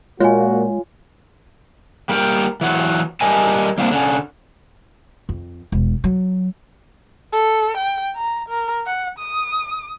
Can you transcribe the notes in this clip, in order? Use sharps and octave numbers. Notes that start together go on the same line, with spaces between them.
A#2 G#3 A#3 F4 F#4 C#5 G#5
G3 A#3 A#4 B4 G5
E3 F#3 F#4
G3 G4 A#4 D#5 G#5 A5
G3 A#3 C4 D4
D3 C#4
F2
E1
F#3
A4
G5
A#5
A#4
F#5
D#6